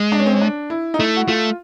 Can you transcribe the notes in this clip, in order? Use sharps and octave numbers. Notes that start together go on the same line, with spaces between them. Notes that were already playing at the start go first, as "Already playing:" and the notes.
Already playing: G#3
D4
C#4
C4
C#4
D4
E4
D#4
A3 E4
F#4
A3 F4